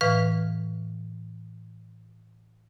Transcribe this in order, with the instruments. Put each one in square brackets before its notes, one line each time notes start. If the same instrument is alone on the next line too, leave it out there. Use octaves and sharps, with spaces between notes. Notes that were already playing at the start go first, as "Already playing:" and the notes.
[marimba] A2 E3 B4 F5 F6